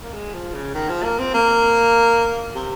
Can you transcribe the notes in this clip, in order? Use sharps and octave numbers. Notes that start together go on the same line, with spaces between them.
A#3
G#3
F3
C#3
D#3
F3
A#3
C4
A#3
C3